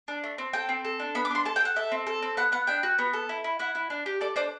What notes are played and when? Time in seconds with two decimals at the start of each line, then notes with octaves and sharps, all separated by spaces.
0.08 D4
0.24 A3
0.38 C4
0.53 A4 G5
0.69 C4
0.85 A4
1.00 D4
1.15 B3 B5
1.25 D6
1.31 D4 C6
1.45 A4 A5
1.56 G5
1.60 A4 F#5
1.76 A4 E5
1.92 C4
2.07 A4
2.22 C4
2.37 B3 F#5
2.52 B3 F#5
2.67 D4 G5
2.83 F#4
2.99 B3
3.13 A4
3.29 E4
3.44 E4
3.59 E4 F#5
3.75 E4
3.90 D4
4.06 G4
4.21 A4 D5
4.36 D4 C5